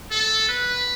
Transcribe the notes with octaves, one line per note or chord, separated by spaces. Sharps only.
A4
B4